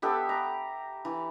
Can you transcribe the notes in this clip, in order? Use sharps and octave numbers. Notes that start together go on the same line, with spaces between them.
B3 G4 A4 E5
A#5
E3